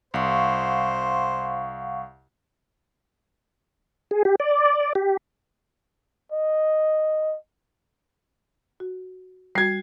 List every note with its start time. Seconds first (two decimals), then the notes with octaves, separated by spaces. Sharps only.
0.14 C2 C5 F5 F#5 C#6
4.11 G#4
4.25 G4
4.40 D5
4.95 G4
6.32 D#5
8.80 F#4
9.55 G3 F#4 G#6 C7